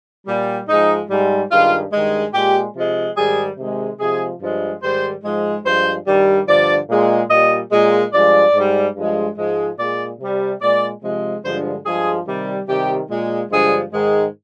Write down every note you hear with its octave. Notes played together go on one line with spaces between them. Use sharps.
A#2 G3
G#2 F3 G#3 D#4
G#2 G3
G2 D#3 G#3 F4
G2 D#3 G#3
A#2 G#3 G4
C3 F3 G#3
G#2 D#3 G3 G#4
C3 D#3 G#3
C3 F3 G#3 G#4
G2 F3 G#3
G#2 D#3 G3 C5
G#2 F3 G#3
G2 F3 G#3 C5
G2 D#3 G3
G2 D3 F3 D5
A#2 G#3
A#2 G3 D#5
A#2 G#3
G2 F3 G#3 D5
G#2 G3
G2 F3 G#3
G#2 F3 G#3
A#2 G#3 D5
C3 G3
A#2 G#3 D5
C3 F3 G#3
G2 D3 F3 G#3 C5
G2 F3 G#3 G#4
C3 D#3 G3
C3 D#3 G3 G4
A#2 G#3
G2 D3 F3 G#3 G#4
G#2 D#3 G#3